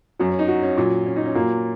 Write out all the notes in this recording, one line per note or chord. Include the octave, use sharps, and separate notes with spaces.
F#2 F#3 C#4
C#4
D#4
F#4
C#4
A#2 F#3
C#4
D#4
C#4
A#2 F#3 A#3